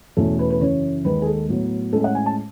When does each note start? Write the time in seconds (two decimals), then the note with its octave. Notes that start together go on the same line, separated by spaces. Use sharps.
0.17 E2 B2 A3 C#4 A4
0.39 B4
0.50 B4
0.61 F#2 C#3 E3 C#5
1.05 D#2 D#3 G#3 B4
1.22 G#4
1.26 A4
1.49 A2 F#3 B3
1.93 A2 G#3 C#4 A4
2.04 F#5
2.15 G#5
2.26 A5